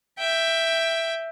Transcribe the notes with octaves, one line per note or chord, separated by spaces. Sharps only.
E5 G5